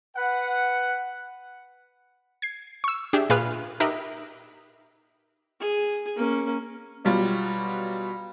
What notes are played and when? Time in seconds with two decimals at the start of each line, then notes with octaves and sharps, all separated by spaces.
0.16 B4 F#5
2.42 G#6 C7
2.84 C#6 E6
3.13 D4 G4 G#4 E5
3.30 A#2 F4 G#4 B4 F6 F#6
3.80 D#4 G4 A#4 B4 D#5 E5
5.61 G#4
6.16 A#3 C#4
7.05 B2 F#3 G3 F4